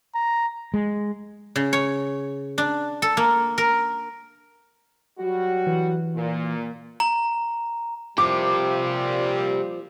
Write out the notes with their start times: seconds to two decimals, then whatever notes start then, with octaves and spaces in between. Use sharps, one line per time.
0.15 A#5
0.74 G#3
1.56 C#3
1.73 C#5
2.58 D4
3.02 A4
3.17 A#3
3.58 A#4
5.19 F#3 G3 F#4
5.67 E3
6.16 A#2
7.00 A#5
8.18 A#2 F3 G3 G4 C5 D6